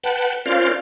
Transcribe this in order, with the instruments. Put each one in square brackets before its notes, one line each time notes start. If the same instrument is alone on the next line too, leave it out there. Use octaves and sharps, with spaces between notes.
[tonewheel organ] B4 F#5 G5 A5
C#4 F4 A#4 C5 D5 F5